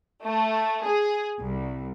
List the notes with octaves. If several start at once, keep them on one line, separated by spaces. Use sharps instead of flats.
A3
G#4
C2